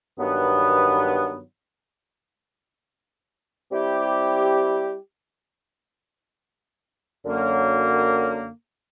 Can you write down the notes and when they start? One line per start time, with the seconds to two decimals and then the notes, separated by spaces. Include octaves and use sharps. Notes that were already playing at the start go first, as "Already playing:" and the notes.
0.18 G2 D#3 F#3 B3
3.71 G3 C4 E4 G4
7.24 F#2 D3 F#3 A#3